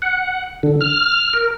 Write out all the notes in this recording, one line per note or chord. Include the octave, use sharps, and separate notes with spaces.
F#5
D3
F6
A#4